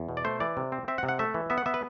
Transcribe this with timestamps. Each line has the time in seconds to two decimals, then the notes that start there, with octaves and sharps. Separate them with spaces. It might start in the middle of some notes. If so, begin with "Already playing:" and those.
Already playing: E2
0.09 B2
0.17 D5
0.24 A3 C5
0.40 E3 D5
0.57 C3
0.72 C4
0.88 C4 E5
0.98 F#5
1.03 C3
1.09 F#5
1.19 A3 E5
1.34 E3
1.50 B3 E5
1.58 F#5
1.66 B3 E5
1.74 B4